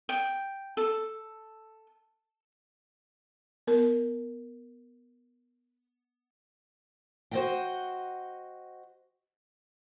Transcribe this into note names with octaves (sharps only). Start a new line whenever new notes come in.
G5
A4
B3 A#4
F#4 C5 D5 D#5 F#5 G5